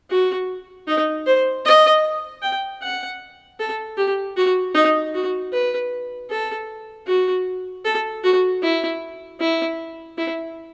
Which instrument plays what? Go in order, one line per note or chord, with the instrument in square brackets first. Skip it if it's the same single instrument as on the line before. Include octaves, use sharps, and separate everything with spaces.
[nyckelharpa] F#4
D#4
C5
D#5
G5
F#5
A4
G4
F#4
D#4
F#4
B4
A4
F#4
A4
F#4
E4
E4
E4